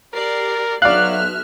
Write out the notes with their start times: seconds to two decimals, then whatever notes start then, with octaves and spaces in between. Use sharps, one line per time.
0.14 G4 A#4 D5 C7
0.82 B1 F#3 D5 E5 F5 F6 F#6